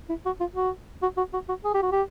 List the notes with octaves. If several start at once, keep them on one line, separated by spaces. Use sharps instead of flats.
E4
F#4
F4
F#4
F#4
F#4
F#4
F#4
G#4
G4
F#4
G4